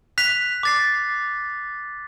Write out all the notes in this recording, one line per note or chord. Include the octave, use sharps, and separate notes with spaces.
F#6 B6 F7
D6 A6 C7